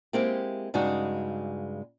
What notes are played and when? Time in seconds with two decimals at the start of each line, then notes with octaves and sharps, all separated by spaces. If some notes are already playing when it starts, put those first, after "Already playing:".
0.13 G#3 A#3 C4 E4 G4
0.74 G2 C#3 G#3 D#4 F#4